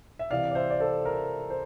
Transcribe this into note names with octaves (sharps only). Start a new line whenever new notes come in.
E5
C3 E3 D5 F5
D5
C5 E5
D5
A4 C5
A#4
C5